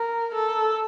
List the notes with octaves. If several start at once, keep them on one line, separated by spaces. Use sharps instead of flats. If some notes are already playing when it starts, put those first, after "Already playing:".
Already playing: A#4
A4